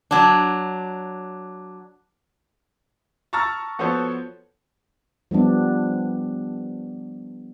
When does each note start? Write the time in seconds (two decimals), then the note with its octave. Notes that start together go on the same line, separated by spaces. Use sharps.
0.11 F#3 D4
3.33 A5 A#5 C#6 E6 F6 A6
3.79 F3 B3 F#4 A4 C5 C#5
5.31 F3 G3 B3 D4